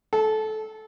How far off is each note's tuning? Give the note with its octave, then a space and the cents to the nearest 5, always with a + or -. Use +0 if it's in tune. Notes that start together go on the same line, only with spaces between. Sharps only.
A4 -20